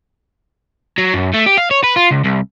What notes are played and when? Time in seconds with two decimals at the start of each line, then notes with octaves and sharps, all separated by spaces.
0.98 F#3
1.14 F#2
1.34 A3
1.46 G4
1.57 F5
1.71 C#5
1.84 B4
1.97 F4
2.11 C#2
2.25 C2